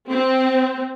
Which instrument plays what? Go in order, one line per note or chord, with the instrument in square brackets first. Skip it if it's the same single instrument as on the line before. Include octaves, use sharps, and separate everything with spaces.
[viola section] C4